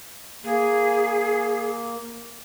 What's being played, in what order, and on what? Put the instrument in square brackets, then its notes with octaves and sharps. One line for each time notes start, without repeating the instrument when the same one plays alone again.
[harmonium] A#3 [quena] G#4